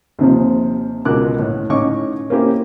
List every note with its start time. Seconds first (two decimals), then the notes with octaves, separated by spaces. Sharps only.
0.19 D#2 C3 F3
1.05 C#2 B2 A#4 D6 F#6
1.39 A2
1.70 A2 C#4 D#4 C#6 D6
2.30 A#3 C4 C#4 E4 G4